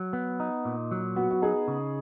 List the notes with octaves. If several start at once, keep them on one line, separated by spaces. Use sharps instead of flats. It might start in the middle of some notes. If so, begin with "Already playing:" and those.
Already playing: F#3
B3
D#4
A#2
F#3
B3 F#4
F#4
D#4 G#4
C#3